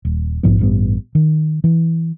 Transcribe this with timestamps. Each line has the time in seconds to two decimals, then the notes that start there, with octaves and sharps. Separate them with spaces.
0.05 D#1
0.43 A#1 G#2 F3 B3
0.59 A1 G2 B3
1.15 D#3
1.64 E3